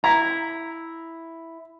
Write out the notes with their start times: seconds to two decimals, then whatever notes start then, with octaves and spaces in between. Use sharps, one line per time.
0.04 E4 A#5